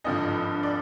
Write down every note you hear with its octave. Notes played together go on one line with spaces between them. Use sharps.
G#1 G2 D3 F3 D#5
D5